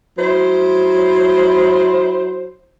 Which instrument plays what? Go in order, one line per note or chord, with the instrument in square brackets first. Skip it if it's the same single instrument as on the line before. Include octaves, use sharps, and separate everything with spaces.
[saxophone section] F#3 E4 C5